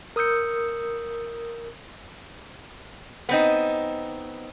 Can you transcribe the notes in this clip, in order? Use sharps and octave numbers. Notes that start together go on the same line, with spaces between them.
A#4 D#6 E6 G6 C#7
B3 C4 D#4